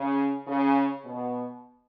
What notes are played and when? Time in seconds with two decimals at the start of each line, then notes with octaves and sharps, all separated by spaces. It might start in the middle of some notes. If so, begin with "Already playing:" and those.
Already playing: C#3
0.48 C#3
1.04 B2